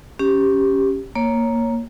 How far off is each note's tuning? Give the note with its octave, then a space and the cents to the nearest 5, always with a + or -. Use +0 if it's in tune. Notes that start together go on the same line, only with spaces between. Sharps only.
C#4 +0 G4 +0
A#3 +0 C#5 +0